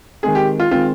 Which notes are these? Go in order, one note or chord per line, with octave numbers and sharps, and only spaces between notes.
D#3 G#3 C4 G#4
G4
F4
D#3 G#3 C4 F4